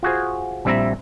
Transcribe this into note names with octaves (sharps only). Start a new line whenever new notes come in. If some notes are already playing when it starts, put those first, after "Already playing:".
F4 F#4 G#4 C5
A#1 G3 C4 E4 E5 A#5